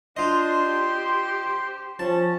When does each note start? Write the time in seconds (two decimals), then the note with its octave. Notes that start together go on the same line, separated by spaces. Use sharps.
0.17 D4 F4 C5 D#5 C6
0.68 G4
1.99 F3 C#4 A5